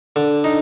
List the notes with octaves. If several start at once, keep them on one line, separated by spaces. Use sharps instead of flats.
D3
D#4